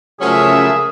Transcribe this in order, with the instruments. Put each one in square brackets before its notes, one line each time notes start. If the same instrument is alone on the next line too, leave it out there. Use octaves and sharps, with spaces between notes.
[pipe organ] C#3 A3 E5 [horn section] F3 F#3 C#4 [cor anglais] G#4 [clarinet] A#4